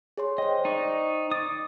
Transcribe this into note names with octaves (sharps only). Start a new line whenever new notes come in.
G#4 C#5 C6
C5 D#5 G5
D#4 D5 C#6
D6 D#6 A6